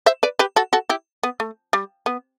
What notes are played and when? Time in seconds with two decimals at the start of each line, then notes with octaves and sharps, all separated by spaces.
0.06 C5 E5
0.23 B4 D5
0.39 G4 B4
0.56 F#4 A4
0.73 F#4 A4
0.89 E4 G4
1.23 B3
1.40 A3
1.73 G3
2.06 B3